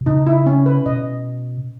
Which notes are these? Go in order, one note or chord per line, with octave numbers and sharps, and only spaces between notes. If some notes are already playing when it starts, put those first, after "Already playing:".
B2
C#3 D#4
E4
C#4
B4
B2 D#5